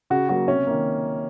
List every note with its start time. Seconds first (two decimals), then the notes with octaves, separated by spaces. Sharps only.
0.10 C#3 F#4
0.29 F#3 A#3 F#4
0.48 C3 C#4
0.67 D#3 A#3